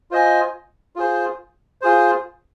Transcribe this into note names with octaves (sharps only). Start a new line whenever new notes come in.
F4 C5 D#5 G#5
F4 G#4 C5
F4 G#4 C5